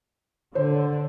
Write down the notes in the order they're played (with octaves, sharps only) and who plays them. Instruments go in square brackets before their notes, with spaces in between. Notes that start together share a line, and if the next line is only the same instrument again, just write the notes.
[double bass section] D3 [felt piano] C5